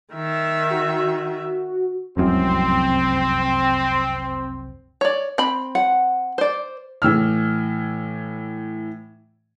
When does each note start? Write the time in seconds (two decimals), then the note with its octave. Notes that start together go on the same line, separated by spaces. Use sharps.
0.14 D#3 E5
0.71 F#4
2.17 F1 C2 F#2 C4
5.01 C#5 D5
5.38 C4 B5
5.75 F#5
6.38 C5 D5
7.02 A2 E3 E6 F6